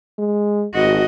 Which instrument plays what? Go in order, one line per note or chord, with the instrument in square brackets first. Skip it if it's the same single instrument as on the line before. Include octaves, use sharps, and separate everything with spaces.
[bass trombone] G#3
[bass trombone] G#1 [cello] F#4 D#5